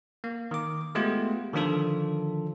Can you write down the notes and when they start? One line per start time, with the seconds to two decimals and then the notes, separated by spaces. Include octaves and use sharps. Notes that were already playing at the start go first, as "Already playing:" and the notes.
0.24 A#3
0.51 D#3 D6
0.95 G#3 A3 B3 F4 G4
1.53 D3 D#3 F3 D4 F4 A4